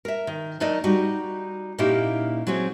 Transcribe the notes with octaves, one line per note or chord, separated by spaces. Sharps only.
A#4 E5
D#3
F#3 A3 D#4 A#4 D5 D#5
G3 D#4 F#4
A#2 A#3 C#4 D#4 E4 G4
F#3 C4 G#4 C#5